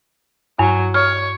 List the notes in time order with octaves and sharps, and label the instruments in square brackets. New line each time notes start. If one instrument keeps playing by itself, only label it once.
[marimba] G2 [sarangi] F#3
[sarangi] C#5 [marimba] F6